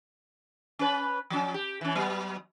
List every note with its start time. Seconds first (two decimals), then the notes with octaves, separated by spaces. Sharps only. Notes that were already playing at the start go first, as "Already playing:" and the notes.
0.79 C#4 B4
1.30 F3 C#4
1.54 G4
1.81 E3 C#4
1.95 F#3 B3